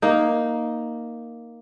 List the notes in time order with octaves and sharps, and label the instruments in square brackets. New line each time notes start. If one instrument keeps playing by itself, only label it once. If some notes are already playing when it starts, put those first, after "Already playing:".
[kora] A#3 D#4